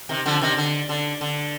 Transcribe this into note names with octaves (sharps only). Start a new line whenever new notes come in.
C3 D#3
D3 F3
C3 D#3
D3
D3
D3